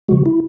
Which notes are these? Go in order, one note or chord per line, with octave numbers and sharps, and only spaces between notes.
C#3 F3 G#3 F#4
E4